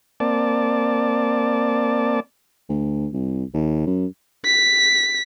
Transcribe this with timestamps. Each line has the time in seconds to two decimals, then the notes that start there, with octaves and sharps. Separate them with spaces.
0.20 A#3 C4 D5 A5
2.69 D2
3.13 C2
3.54 D#2
3.86 F#2
4.45 B6